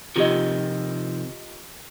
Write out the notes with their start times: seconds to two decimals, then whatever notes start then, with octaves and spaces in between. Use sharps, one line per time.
0.16 C3 D#3 F3 F4 G4 D#5